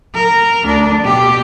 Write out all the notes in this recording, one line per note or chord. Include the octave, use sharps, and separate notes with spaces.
A#4
D2 D4
B2 G4